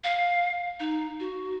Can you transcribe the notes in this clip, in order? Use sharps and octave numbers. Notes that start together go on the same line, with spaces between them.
F5
D#4
F#4